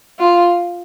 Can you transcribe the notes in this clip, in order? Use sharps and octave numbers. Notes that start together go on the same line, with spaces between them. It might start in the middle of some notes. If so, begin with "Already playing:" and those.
F4